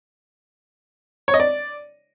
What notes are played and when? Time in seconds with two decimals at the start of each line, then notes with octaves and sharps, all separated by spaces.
1.28 C#5
1.34 D#5
1.40 D5